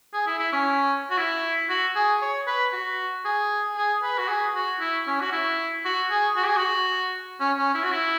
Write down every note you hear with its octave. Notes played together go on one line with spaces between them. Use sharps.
G#4
E4
E4
C#4
F#4
E4
F#4
G#4
C#5
B4
F#4
G#4
G#4
B4
F#4
G#4
F#4
E4
C#4
F#4
E4
F#4
G#4
F#4
G#4
F#4
C#4
C#4
E4
F#4
E4